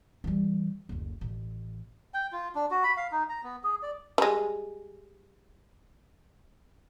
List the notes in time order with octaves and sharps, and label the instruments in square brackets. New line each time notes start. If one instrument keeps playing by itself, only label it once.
[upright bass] E3 G3
F#1 D2
A1
[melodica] G5
F4
D4
F#4
B5
F5
D#4
A#5
B3
G#4
D5
[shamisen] G3 G#3